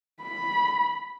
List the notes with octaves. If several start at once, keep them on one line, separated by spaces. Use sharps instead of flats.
B5